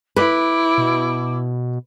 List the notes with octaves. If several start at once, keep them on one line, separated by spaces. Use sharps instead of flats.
E4 B4 D6
B2